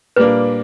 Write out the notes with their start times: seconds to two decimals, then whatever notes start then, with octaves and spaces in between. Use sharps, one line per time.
0.16 A#2 G3 A#3 D4 B4